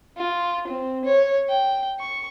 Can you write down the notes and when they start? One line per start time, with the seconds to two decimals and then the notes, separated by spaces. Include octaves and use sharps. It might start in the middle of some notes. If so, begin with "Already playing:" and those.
0.17 F4
0.67 C4
1.04 C#5
1.49 G5
2.00 C#6